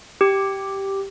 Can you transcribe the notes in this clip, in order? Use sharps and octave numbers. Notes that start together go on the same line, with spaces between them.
G4